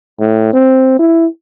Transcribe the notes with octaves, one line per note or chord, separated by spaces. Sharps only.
A2
C4
E4